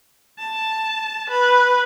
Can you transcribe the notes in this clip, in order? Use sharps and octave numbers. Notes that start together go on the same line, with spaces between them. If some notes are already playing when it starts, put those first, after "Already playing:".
A5
B4